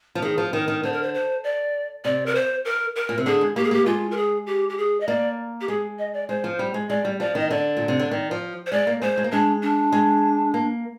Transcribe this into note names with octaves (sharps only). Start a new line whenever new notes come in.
F3
D#3 G#4
F3
D#3 A#4
D#3
D3 C5
A#4
C5
C5
D5
C3 D5
A#4
C5
A#4
A#4
A#2
C3
D3 G#4
G#3
A#3 G4
G#4
A#3 G4
G#3 F4
A#4
G#4
G4
G4
G#4
D#5
A#3 D5
G4
G#3 G#4
D#5
D5
G#3 C5
F3
G3
G#3
G#3 D5
G3
F3 D5
D#3 D#5
D3 D5
A#2
C3
D3
D#3
F3
C5
G#3 D5
A#3
G#3 C5
G#3
A#3
G#3 D4
D4
G#3
A#3